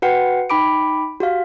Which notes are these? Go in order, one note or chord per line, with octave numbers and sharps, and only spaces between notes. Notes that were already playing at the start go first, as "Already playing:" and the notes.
F#4 B4 F#5 G5 C#7
D#4 G5 B5 D6 D7
F#4 G4 F5